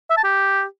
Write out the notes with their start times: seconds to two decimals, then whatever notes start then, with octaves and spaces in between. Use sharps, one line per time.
0.10 E5
0.17 A5
0.24 G4